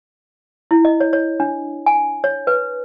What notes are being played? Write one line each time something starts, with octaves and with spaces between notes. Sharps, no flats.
E4
D#5
C#5
C#5
D4
G#5
C#5
B4